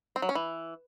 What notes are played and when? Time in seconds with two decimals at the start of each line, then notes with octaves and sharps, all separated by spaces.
0.16 C4
0.22 F#3
0.29 C#4
0.35 E3